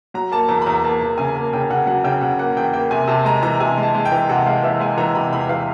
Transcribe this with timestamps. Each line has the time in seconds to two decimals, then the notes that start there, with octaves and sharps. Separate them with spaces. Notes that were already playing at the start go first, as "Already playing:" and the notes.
0.14 F#3 A#5
0.32 A#3 A5
0.49 E2 A#5
0.62 B5
0.66 E2 A#5
0.84 A#3 A5
1.01 E2
1.18 C#3 G#5
1.35 A#3
1.53 C#3 G5
1.70 C#3 F#5
1.87 F#3 F#5
2.04 C#3 G5
2.22 C#3 F#5
2.38 A#3 F#5
2.57 E2 G5
2.73 A#3 G5
2.91 C3 G#5
3.08 C3 A5
3.25 G#3 A#5
3.43 E3 A#5
3.60 C3 G#5
3.78 G#3
3.83 A5
3.95 G#3
4.05 G5
4.12 E3
4.29 C3 F#5
4.46 G#3 F5
4.64 E3 E5
4.80 G#3 G#5
4.98 E3 A#5
5.15 C3 B5
5.33 E2 B5
5.49 E3 F5